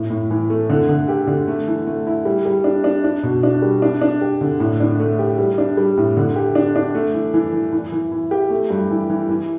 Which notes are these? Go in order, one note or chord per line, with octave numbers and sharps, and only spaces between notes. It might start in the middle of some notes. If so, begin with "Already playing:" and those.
Already playing: A2
A2
E3
A3
D3
D3
G4
D3
A3
E3
A3
E4
G3
G3
D4
D4
D4
B2
D4
G3
D4
D4
G4
D3
A2
D4
A3
G4
G3
D4
G3
A2
D3
G4
D4
D4
A3
E3
E3
E3
E3
E3
E3
G4
A3
G2
E3
E3
E3